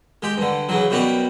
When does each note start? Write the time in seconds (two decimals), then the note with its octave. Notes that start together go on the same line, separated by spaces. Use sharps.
0.23 G#3 G4
0.38 G2 D3
0.69 C#3 E3 F#3
0.90 F#2 B2 G3 F#4 G4